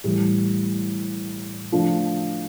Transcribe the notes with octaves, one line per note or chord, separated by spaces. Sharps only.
A2 E3 G3
F3 A3 D4